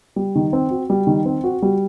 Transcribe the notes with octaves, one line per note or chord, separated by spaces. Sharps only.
G3
D#3
C4
F#4
G3
D#3
C4
F#4
G3